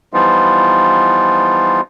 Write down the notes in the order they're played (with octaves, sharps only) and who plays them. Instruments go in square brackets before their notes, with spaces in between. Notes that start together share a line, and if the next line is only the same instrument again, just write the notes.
[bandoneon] E3 F3 G3 B3 D#4 F4